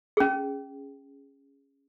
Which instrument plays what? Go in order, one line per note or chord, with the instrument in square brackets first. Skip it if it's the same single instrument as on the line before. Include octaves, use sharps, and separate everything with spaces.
[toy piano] C#4 G#4